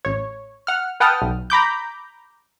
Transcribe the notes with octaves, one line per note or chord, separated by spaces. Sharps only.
A1 C#5
F#5 F6
B4 F#5 G5 A5 D#6 F6
B1
A#5 B5 D6 G6